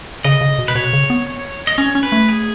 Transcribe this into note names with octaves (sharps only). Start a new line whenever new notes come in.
C#3 D#5
C#3
B2
B4
B2 C#5
C#3
B3
D#5
C#4 C#5
C#4
B4
A3
G#4